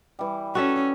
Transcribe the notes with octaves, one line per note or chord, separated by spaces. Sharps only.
E3 G3
C#4 F#4 A4 E5